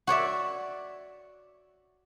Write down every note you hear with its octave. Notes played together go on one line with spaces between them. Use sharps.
F#4 C#5 D5 E5